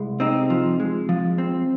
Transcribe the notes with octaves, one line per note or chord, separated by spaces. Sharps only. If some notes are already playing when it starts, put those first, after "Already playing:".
Already playing: C2 G#3
C3 C4 D#4
F3
G#3
F3
C4